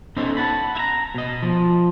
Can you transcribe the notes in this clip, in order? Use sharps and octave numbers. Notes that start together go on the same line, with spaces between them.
B3 C#4 D#4 A4 C5 C#5
F#5 A5 B5
E4 A#5
B2 D#5
F3